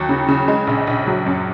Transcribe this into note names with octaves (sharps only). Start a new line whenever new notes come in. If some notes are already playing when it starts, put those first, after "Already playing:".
Already playing: D#2 F#3
C#3
C#3
G#3
A#1
A#1
F#3
F#2